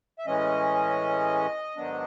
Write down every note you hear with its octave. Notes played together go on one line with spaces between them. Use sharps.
E5
A2 E3 G#3 C#4 D#5
G#2 D#3 F#3 B3 D4